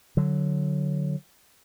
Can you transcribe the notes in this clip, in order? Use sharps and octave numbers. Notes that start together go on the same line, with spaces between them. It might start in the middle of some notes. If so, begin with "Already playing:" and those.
D3 F#3